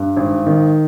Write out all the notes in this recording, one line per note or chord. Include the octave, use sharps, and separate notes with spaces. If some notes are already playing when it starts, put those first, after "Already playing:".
Already playing: G2
G#1
D#3